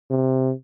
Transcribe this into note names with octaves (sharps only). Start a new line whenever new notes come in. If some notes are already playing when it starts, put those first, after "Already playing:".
C3